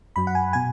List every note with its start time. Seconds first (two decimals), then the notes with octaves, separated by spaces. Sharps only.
0.16 F#2 F#3 B5
0.27 F#5
0.35 G#5
0.53 B2 G#5